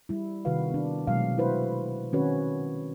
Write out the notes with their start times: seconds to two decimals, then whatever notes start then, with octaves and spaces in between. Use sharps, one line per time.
0.09 G3 E4
0.45 C3 D#3 F#4 B4 F5
0.70 B3 D4
1.07 B2 F#3 G#3 A3 F5
1.38 E4 F#4 B4 C5
2.12 D#3 C4 C#4 F#4 B4 C#5